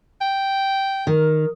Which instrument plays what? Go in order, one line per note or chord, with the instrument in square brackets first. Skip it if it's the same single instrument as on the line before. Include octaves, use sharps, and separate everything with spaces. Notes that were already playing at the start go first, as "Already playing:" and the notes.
[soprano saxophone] G5
[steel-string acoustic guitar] D#3 [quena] A#4